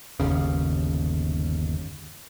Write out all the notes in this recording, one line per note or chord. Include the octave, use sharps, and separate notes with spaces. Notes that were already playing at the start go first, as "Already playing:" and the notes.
G1 D#2 C#3